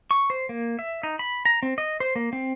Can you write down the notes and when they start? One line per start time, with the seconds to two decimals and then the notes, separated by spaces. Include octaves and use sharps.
0.11 C#6
0.30 C5
0.49 A#3
0.79 E5
1.03 D#4
1.19 B5
1.46 A#5
1.63 C4
1.78 D#5
2.00 C5
2.16 A#3
2.33 C4